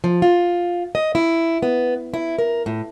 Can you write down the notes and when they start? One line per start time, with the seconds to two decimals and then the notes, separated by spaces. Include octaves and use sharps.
0.04 F3
0.22 F4
0.95 D#5
1.15 E4
1.62 B3
2.14 E4
2.38 A#4
2.66 A2